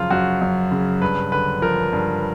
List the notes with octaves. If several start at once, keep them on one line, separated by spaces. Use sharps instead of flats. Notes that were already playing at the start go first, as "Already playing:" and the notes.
Already playing: F#2 C#3 F3 F4
F#2 F#4
F#2
C#3
G2 B4
D3 B4
F3 A#4
G2